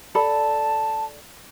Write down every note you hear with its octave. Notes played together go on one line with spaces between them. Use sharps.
A4 D5 A5 B5